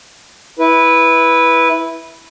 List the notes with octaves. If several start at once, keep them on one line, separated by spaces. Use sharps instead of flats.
E4 B4